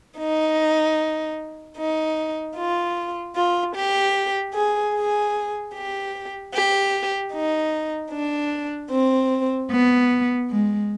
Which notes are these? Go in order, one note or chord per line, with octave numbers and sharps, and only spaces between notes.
D#4
D#4
F4
F4
G4
G#4
G#4
G4
G4
D#4
D4
C4
B3
G#3